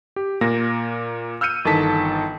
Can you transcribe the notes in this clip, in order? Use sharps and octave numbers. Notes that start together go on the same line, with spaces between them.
G4
A#2 A#3 A#6
E6 F6 G6 C#7 D#7
G1 D#3 E3 A4 A5 B6